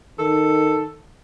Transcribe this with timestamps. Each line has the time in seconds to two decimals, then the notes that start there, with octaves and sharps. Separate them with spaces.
0.19 D#3 A4